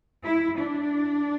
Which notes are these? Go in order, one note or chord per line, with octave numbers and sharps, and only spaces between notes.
E4
D4